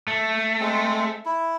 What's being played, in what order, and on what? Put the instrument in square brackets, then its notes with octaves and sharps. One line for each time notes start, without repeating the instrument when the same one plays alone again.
[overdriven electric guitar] A3
[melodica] G#3 C4
E4